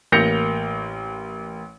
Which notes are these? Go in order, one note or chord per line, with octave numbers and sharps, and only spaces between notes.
A1 A#3 G6 A#6 C#7 F7